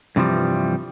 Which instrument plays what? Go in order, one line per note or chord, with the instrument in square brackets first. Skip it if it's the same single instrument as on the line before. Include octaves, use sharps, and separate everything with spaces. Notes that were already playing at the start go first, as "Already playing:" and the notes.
[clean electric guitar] G2 C3 E3 F3 G3